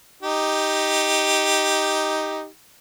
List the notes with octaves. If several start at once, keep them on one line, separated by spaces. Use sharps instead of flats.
D#4 G4